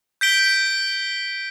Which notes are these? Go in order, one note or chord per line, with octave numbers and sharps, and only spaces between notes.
G6 B6 D7 G7